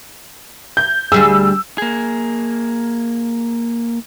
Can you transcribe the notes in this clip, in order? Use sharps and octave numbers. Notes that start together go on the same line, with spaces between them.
G6
D2 G3 G#4 E6
A#3 G#4